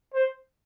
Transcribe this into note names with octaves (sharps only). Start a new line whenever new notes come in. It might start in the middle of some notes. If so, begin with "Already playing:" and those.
C5